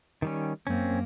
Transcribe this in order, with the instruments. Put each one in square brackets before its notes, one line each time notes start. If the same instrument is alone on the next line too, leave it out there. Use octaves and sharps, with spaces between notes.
[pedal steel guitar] D#3 G3 C#4
[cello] F#2 A#3 [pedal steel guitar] C4 C#4